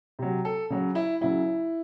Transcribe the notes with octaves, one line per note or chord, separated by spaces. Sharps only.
C3 F#3
A4
C#3 F#3
E4
C#3 F#3 E4